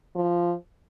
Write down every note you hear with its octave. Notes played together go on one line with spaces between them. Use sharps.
F3